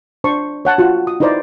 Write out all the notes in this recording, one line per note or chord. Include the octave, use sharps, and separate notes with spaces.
D4 C5 A5 C6 C#6
C#5 F#5 A5
F4 F#4
D#6
D#4 E4 B4 C5 D5 A#5